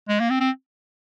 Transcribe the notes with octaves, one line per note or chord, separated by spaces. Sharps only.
G#3
A#3
C4
C4